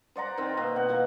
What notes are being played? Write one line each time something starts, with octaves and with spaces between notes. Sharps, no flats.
C5 D5 F#5 A#5
D#3 C4
B2 A#3
F#5
B2 E3 A#3